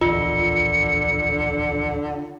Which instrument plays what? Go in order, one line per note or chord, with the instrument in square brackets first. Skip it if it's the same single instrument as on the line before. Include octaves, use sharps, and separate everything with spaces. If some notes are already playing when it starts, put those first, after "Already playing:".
[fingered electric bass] D1 A#1 E2 [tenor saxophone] D3 [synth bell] F4 [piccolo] C#7